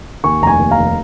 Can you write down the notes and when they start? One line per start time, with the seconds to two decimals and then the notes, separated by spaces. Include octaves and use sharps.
0.24 D#2 G#5 C#6
0.42 F1 A#5
0.47 G#5 C#6
0.59 D#2
0.71 F5 A#5
0.77 F1